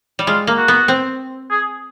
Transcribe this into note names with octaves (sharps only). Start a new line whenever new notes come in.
G3
G#3 F4
A#3
F#4
B3
C4
G#4